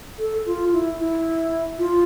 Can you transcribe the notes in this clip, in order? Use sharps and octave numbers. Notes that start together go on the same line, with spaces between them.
A4
F4
E4
E4
F4